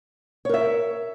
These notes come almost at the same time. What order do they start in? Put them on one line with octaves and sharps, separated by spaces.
C#5 A#4 E5